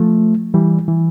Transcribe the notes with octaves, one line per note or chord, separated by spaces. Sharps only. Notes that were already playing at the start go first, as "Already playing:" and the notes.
Already playing: F3 A3
E3 G3
E3